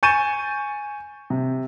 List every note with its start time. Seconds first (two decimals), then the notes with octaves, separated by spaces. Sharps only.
0.03 G#5 C#6 G6 A6 D#7 E7
1.30 C3